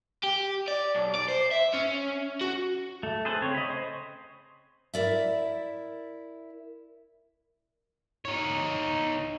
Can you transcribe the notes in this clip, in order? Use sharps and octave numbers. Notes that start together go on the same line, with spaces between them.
G4
D5
B1
D5
C5
E5
C#4
F#4
A3
G#4 A4 B4 C5
C#3 C4 C#5
D#5 B5
C5
E4 A#4 D5 E5
D#4 C#5